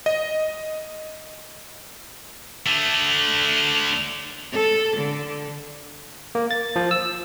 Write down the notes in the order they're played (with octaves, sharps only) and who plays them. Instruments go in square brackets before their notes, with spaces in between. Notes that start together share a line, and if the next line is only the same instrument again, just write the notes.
[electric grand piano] D#5
[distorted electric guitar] D3 A3
[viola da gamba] A4
D3
[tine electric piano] A#3
A6
F3
E6